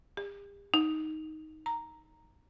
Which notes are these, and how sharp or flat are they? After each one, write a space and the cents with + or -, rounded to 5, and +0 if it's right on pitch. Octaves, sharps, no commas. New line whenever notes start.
G4 +40
D#4 +5
A#5 -5